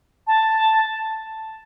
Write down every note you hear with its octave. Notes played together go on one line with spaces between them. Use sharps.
A5